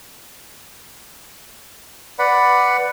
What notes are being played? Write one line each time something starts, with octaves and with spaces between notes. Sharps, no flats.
B4 D5 F#5 B5